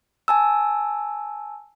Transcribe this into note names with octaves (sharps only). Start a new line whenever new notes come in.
G#5 A5 E6